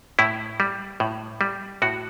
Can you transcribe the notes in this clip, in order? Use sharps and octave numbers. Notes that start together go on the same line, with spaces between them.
A2 E4
G3
A2
G3
A2 F#4